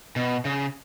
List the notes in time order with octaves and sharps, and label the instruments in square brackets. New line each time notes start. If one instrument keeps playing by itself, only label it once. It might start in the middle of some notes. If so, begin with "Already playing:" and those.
[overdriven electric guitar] B2
C#3